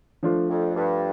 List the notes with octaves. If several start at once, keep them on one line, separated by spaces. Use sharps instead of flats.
F3 A3 D4 F4
F2
G2